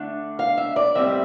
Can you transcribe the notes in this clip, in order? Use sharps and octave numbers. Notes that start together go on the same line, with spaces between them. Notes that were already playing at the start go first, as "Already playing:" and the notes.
Already playing: D3 A3 D4
F5
E5
D5
A2 G3 C4 E5